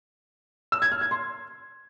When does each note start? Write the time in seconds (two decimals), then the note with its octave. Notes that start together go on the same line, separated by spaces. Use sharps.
0.72 E6
0.82 G#6
0.92 F6
1.01 G#6
1.11 C6